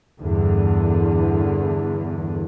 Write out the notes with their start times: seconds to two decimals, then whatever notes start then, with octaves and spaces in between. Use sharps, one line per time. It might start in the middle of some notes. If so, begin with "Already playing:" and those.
0.19 E2 G2 D3